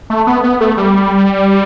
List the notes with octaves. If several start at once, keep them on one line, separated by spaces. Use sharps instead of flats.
A3
B3
B3
A3
G3